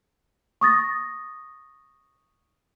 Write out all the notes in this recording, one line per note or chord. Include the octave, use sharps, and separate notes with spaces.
C#6 D#6 A6 A#6